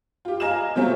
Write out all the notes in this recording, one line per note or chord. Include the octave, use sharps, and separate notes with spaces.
F4 G4
D#5 F5 G#5 A#5 F6 E7
C3 F#3 A3 C4 C#4 F4